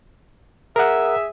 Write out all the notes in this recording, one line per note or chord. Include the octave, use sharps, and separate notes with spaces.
G#4 A#4 E5 F#5